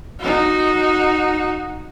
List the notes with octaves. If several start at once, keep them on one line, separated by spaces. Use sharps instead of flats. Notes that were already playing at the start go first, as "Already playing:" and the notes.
D#4 F#4